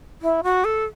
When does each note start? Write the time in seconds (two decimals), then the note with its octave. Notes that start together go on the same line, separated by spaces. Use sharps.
0.22 E4
0.43 F#4
0.65 A4